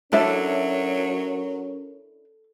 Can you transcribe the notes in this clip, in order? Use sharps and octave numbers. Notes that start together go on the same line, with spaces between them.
F#3 C#4 D4 E4 A4 A#4 C#5 E5